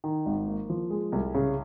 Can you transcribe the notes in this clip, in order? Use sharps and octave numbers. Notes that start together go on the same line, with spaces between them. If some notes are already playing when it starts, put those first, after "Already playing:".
D#3
G#1
A#3
F3
G#3
C2
C#3